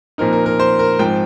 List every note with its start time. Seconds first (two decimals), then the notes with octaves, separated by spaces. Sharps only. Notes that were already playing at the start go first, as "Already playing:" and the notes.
0.18 A#2 F3 C4 D#4 A#4
0.33 A#4
0.46 A#4
0.60 C5
0.79 A#4
0.99 G#2 F3 C4 G5